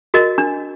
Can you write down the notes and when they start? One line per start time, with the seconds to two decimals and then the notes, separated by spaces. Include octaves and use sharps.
0.14 F#4 A#4 D#5
0.38 D4